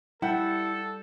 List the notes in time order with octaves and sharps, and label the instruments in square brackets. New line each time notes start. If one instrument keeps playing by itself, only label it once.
[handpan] G3 [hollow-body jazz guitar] E4 [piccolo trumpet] A4 [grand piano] F#5 G5 G6